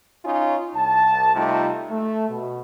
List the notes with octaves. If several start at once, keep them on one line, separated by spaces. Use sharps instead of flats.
C#4 D#4 F4 C#5 G#5
C2 A5
C3 G3 A3 D#4 F4
A3
B2